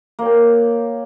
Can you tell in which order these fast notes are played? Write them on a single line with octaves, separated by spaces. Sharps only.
A#3 C#5 G4